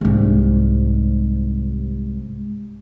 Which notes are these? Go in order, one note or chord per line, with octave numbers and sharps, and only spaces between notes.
C2 G#2